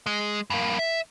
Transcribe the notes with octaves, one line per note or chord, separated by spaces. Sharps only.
G#3
G2 A#3
E5